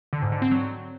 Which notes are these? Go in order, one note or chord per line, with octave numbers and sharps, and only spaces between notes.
D3
G#2
D3
C4
F#3